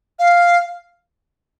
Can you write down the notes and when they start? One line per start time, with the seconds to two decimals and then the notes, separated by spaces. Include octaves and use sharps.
0.19 F5